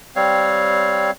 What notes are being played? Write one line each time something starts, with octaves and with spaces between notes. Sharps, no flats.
G3 C4 C#5 F5